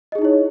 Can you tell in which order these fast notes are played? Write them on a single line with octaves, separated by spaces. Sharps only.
D#5 G#4 D#4 E4 C#5